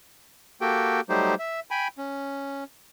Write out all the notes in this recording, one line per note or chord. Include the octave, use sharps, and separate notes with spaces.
A#3 F#4 G4 A4 G5
F#3 G3 A3 D#4 G4 C5
E5
G5 G#5 B5
C#4